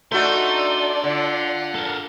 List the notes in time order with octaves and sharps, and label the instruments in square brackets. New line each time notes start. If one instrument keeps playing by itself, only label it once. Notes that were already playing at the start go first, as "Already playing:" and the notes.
[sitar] A3 F#4 [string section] D4 D5 [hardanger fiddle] D#4 A4 [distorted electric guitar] C6
[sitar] D3 [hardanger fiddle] F4 F#5
[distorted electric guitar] A4 A#4